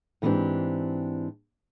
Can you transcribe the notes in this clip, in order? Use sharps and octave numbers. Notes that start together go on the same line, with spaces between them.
G#2 E3 B3 C4 D4 G4